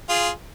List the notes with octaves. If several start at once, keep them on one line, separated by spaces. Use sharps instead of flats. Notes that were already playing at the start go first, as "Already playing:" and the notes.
F4 G#4